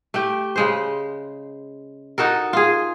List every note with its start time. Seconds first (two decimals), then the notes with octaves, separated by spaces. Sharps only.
0.14 A3 G4 G5
0.56 C#3 G#3 C5
2.18 D#4 F#4 A4 A#4
2.53 F4 G#4